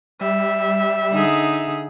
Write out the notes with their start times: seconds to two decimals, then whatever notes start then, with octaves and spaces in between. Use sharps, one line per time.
0.21 G3 E5
1.13 D3 D#4 G#4